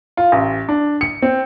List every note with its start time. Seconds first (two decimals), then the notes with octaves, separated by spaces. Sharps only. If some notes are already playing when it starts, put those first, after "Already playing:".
0.17 F4
0.32 A1
0.69 D4
1.01 C#7
1.22 C4